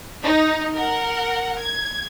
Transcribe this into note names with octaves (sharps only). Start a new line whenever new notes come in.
D#4
A#4 F#5
G#6